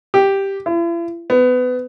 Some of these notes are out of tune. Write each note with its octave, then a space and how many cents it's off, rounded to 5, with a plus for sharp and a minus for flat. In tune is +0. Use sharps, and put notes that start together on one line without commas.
G4 +0
E4 +45
B3 +25